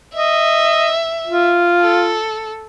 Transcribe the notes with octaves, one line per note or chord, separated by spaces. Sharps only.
D#5 E5
F4
A4